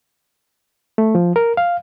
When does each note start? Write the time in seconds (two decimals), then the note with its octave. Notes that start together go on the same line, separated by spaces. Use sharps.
0.98 A3
1.15 F3
1.36 A#4
1.57 F5